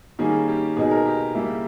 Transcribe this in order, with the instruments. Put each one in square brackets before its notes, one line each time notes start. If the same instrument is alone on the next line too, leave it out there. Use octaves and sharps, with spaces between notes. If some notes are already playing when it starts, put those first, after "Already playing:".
[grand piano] D#3 G3 A#3 C#4 G#4
G4
B2 G#3 D#4 G#4
A#4
G4
C#3 G3 A#3 E4